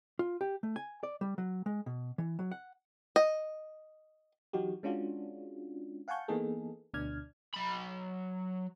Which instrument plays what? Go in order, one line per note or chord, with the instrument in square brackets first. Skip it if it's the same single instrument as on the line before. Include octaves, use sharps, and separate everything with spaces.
[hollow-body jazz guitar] F4
G4
A3
G#5
D5
G3
F#3
G#3
B2
E3
F#3
F#5
[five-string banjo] D#5
[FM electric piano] E3 F#3 D#4 F#4 G4
G#3 C#4 D4 F4 F#4
F5 F#5 G#5 A5 C#6 G6
E3 A#3 B3 D#4 G#4 A4
D2 B2 D4 D5 F6 G#6
[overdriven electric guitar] F#3 B5